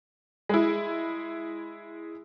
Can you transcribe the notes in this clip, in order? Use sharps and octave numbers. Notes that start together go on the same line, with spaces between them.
G#3 E4